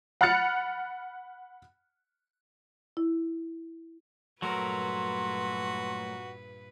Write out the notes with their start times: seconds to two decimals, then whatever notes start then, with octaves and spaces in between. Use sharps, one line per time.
0.21 F#5 B5 F6 F#6 A6 C#7
2.97 E4
4.42 G2 A#2 F#3 A3 F#4 A#4 B4 C6